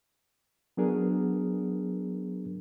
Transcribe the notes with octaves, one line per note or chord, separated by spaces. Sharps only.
F#3 B3 D4 G#4 A#4